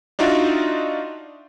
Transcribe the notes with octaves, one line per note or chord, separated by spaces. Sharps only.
D4 D#4 F4 F#4 D5 E5